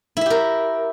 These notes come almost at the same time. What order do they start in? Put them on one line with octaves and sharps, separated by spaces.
E4 E5 G4 A#4